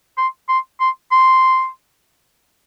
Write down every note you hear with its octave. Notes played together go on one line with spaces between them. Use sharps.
C6
C6
C6
C6